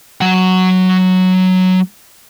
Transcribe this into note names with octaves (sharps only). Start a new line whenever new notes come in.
F#3 F#5